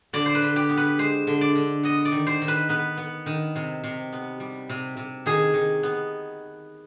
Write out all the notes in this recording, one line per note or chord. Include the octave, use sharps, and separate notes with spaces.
D3 D5
C5
B4
D3
G4
B3
B4
G#3 C5
D3
D5
D3
B3 D#5
D5
D#3
C5
D#3
B4
B3 B4
B3
D#3
C3
C3
B3
G3
C3
C3
D#3 G#4
D#3
B3